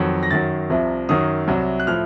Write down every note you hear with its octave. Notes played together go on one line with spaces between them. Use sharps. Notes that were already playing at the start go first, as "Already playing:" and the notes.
Already playing: F2 D#3 F#3
A#6
F#2 D#3 F#3 A6
C2 C3 F3
F#2 D#3 F#3 D#6
C2 C3 F#3
F#6
A2 F3 F6